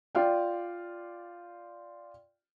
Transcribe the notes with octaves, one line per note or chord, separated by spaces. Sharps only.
F4 D5 F5 G5